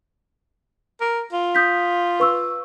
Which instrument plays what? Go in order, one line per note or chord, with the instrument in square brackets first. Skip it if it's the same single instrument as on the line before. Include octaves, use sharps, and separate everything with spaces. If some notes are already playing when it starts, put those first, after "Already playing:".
[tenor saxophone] A#4
F4
[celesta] D#6 G6 B6
B4 C#6 E6